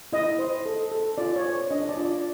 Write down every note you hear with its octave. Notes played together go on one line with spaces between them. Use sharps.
E4 D#5
C5
A4
A4
F4 D5
C#5
C5
D4 D#5
D5
F4
D5